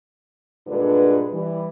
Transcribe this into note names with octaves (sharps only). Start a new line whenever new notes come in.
G2 A#2 D3 G#3 B4
E3 G3